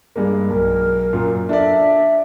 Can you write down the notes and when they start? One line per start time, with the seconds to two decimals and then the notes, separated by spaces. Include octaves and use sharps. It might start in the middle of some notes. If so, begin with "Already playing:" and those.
0.16 G2 G#3 A#3
0.50 B1 A#4
1.13 F#2 A#2
1.49 D4 A4 D5 E5